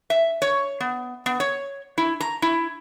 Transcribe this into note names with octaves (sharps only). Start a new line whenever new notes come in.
E5
C#5
B3
B3
C#5
E4
A#5
E4